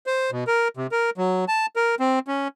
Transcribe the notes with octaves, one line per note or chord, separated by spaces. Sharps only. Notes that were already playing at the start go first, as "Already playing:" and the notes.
C5
B2
A#4
C3
A#4
F#3
A5
A#4
C4
C#4